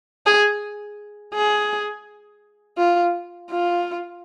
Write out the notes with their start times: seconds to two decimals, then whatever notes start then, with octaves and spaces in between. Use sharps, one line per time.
0.26 G#4
1.34 G#4
2.78 F4
3.51 F4